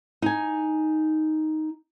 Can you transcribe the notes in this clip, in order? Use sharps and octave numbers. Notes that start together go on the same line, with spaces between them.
D#4 G#5